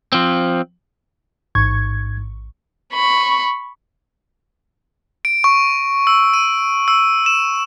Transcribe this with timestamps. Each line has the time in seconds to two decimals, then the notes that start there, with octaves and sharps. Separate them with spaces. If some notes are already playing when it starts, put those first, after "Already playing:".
0.12 F3 C4
1.55 A1 G#2 C#6 G#6
2.93 B5 C#6
5.25 D7
5.44 C#6
6.07 E6
6.33 D#7
6.88 E6
7.26 E7